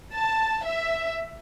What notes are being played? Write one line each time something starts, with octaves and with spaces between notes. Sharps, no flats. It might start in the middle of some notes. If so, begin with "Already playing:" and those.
A5
E5